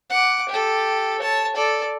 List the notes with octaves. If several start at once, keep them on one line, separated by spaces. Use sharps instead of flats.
F#5 D6
G4 A4
C#5 A5
A4 D5